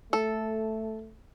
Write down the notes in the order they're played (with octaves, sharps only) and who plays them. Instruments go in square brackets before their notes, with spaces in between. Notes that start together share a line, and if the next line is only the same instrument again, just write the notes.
[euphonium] A3 [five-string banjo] A4